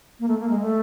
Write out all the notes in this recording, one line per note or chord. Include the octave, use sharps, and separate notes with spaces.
A#3
A3
A#3
G#3
A3